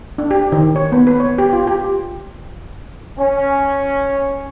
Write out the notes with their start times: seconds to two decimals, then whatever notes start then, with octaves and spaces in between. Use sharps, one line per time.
0.18 D4
0.31 G4
0.52 D#3
0.76 C#5
0.92 B3
1.07 B4
1.20 C#5
1.38 G4
1.53 F4
1.67 G4
3.19 C#4